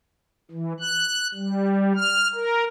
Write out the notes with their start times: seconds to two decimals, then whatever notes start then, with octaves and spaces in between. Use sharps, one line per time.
0.51 E3
0.80 F#6
1.34 G3
1.96 F6
2.35 A#4